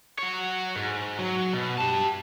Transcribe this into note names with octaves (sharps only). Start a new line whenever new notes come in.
F#4 C#5
G#2
F#3
B2
G4 A5